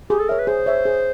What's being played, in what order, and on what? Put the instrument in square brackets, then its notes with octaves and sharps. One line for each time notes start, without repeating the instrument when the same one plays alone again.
[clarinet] G4 [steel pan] G#4
[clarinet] A4
[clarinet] A#4 [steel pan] C#5 E5
[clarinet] B4
[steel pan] G#4 [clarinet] C5
[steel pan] C#5 E5
G#4